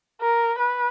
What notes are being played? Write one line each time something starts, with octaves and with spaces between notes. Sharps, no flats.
A#4
B4